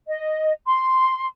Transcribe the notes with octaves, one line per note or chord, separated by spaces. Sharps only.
D#5
C6